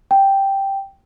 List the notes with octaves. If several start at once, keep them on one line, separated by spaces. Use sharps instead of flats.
G5